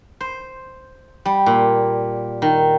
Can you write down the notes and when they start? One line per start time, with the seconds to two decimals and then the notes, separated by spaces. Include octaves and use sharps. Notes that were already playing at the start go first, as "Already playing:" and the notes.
0.20 C5
1.25 G3
1.46 A#2
2.42 D#3